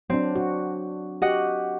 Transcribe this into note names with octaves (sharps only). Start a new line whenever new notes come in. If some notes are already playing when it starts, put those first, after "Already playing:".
F#3 C4 D4
F#4
F#4 G4 D#5 F#5